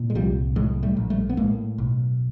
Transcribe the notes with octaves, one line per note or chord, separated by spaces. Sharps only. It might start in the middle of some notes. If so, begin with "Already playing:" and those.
Already playing: A#2
G#3
C2 F3 G3
A2 F#3 G#3
G3 A3
A#1
G3 A3
B3
A2 G#3 A#3
B1